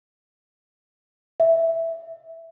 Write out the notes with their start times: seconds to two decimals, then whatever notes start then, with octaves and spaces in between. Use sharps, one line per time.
1.40 E5